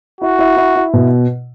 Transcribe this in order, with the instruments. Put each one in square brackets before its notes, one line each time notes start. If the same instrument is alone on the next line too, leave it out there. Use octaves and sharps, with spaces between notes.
[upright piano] E4 [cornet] F#4
[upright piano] E4
E4
E4
B2